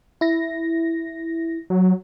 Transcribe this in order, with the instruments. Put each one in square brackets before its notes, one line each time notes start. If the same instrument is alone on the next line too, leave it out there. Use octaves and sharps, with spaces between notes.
[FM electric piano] E4 A#6
[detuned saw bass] F#3